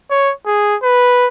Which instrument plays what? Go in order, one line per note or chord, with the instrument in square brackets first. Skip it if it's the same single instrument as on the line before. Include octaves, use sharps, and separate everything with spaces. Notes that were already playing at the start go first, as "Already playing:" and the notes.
[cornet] C#5
G#4
B4